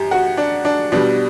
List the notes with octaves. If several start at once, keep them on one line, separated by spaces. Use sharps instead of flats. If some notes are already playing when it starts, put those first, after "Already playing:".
Already playing: F#2 G4
F#4
D4
D4
B2 G3 D4